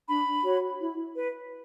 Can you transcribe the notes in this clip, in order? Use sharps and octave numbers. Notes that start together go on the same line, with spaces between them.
D4 B5
F#4 C#5
E4
B4